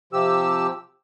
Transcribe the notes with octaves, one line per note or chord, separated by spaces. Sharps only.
C3 F3 G4 E6